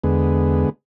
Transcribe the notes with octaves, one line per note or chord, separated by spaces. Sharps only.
E2 D3 G#3 B3